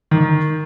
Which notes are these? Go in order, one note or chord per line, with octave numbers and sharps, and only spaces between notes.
D#3